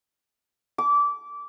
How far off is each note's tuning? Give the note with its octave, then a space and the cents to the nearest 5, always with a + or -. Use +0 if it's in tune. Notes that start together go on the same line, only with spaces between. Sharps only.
D6 -20